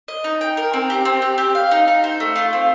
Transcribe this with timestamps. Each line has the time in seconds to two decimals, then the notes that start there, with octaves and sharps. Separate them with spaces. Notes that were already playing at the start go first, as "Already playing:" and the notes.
0.08 D#5
0.24 D#4
0.41 G5
0.57 A#4
0.73 C4
0.90 G4
1.05 C4
1.22 G4
1.38 G4
1.55 F5
1.71 D#4
1.88 D#4
2.04 C5
2.20 A3
2.36 F4
2.53 C4